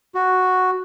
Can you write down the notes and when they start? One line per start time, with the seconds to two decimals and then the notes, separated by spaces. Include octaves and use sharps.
0.15 F#4